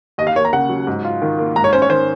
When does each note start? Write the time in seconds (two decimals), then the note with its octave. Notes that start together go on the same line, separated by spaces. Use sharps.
0.18 D#2 D#5
0.27 F5
0.35 A#3 C#5
0.45 A#5
0.53 C#3 F#5
0.69 F#3
0.87 G#2
1.05 F4
1.22 D#3
1.38 A#3
1.56 G#2 A#5
1.64 C#5
1.73 C#4 C5
1.82 C#5
1.89 D#3 C5